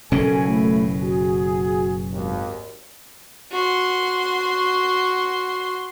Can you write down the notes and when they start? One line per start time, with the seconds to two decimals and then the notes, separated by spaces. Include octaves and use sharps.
0.12 F#1 B2 C#4 A4 G#5
0.48 A3 E4
1.02 F#4 G#4
2.13 G#1 D#2
3.51 F#4 C6